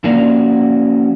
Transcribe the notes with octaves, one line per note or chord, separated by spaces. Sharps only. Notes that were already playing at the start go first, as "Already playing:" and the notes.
F3 A#3 C#4 F#4 D5 F5